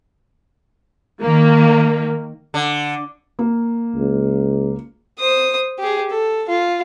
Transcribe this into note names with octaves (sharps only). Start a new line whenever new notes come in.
D#3 A#3
D3
A#3
C#2
C5 D#6
G4 G#4
A4
F4